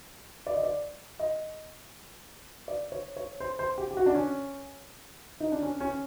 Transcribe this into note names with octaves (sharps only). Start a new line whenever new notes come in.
D5
D#5
D5
D#5
D5
C#5
C#5
C5
C5
G4
G4
F#4
D4
C#4
D#4
D4
C#4
C#4